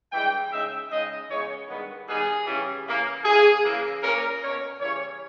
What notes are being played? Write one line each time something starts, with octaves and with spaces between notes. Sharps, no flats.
G2 E3 G#3 G5
C#3 G#3 D#4 E5
C#3 G#3 D#4 D#5
C#3 E3 G#3 B3 C#5
G2 D#3 G#3 B3
D#3 G3 B3 D#4 G#4
C#3 E3 G3 C#4
C#3 E3 A#3
C#3 E3 A#3 G#4
C#3 E3 A#3
A#2 A#3 C#4 A#4
B2 A#3 C#4 C#5
C#3 E3 G3 C#4 C#5